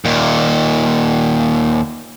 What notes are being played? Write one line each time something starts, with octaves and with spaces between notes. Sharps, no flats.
D#2 A#2